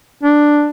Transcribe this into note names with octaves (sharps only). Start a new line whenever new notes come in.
D4